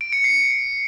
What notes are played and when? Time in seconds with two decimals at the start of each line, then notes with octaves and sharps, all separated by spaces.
0.01 D7
0.12 C#7
0.24 C7